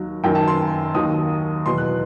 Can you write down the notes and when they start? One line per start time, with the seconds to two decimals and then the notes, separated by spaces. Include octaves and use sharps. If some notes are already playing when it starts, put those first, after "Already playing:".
Already playing: D#2 D#3 F#3
0.23 F#2 D#3 F#3 G5
0.35 A5
0.47 C6
0.94 D#2 D#3 F#3 D#6
1.66 E2 B2 F#3 C6
1.78 F#6